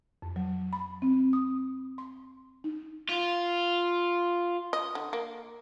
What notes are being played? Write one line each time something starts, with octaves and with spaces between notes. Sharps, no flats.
F2
F#3
B5
C4
D#6
C6
D#4
F4
D#5
D3
A#3